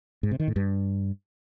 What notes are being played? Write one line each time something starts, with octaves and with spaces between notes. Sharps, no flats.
G#2
C3
D#3
A2
G2